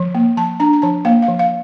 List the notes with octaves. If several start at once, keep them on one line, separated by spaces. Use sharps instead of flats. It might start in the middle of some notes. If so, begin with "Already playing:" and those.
Already playing: F3
A#3
F3 A5
D4 A#5
A#5
F3 A5
A#3 F5
F5
F3
F5